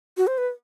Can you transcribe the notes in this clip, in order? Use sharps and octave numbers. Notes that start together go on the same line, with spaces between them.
F#4
C5
B4